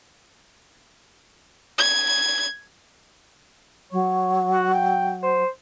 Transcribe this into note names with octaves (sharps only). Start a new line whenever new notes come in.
G#6
F#3 C#5
F#4
G5
C5